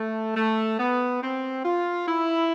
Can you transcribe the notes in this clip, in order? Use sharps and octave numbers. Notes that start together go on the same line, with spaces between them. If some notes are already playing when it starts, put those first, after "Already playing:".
Already playing: A3
A3
B3
C4
F4
E4